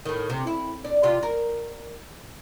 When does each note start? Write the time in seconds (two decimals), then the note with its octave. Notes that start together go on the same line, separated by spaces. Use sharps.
0.05 A2 D#3
0.30 C3
0.47 E4
0.85 D4
1.03 C3 F4 G4
1.23 A#4